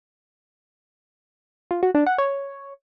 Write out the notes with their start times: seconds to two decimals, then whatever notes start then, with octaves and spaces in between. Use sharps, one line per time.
1.71 F4
1.83 F#4
1.95 D4
2.06 F#5
2.18 C#5